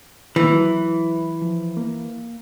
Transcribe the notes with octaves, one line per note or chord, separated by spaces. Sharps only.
D#3 E3 A#3
F#3
F3
A#3